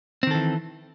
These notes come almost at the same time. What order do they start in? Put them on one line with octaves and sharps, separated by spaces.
C4 D#3 A4 E3